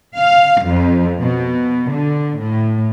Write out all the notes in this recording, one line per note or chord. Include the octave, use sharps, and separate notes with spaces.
F5
F2
B2
D3
A2